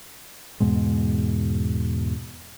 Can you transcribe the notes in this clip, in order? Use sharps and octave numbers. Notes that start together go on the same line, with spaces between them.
E2 G#2 B2 G#3